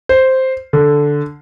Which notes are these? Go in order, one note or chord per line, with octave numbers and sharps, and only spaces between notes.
C5
D3